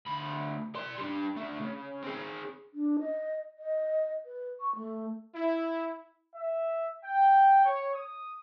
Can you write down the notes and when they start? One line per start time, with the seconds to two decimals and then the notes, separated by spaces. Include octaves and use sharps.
0.07 D2 B5
0.75 D5 C6
0.98 G3 D4
1.36 D2 A3
1.59 C#3
2.03 C4 G#4
2.74 D4
2.99 D#5
3.59 D#5
4.26 B4
4.60 C#6
4.76 A3
5.35 E4
6.34 E5
7.03 G5
7.63 C#5
7.94 D#6